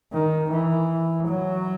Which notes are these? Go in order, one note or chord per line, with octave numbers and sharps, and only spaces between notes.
D#3
E3
F#3